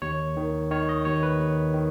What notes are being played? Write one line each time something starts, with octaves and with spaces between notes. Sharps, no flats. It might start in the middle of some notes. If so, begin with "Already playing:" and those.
D#2 C#5
D#3
D#3 C#5
D#5
D#2 C#5
B4
D#2
D#3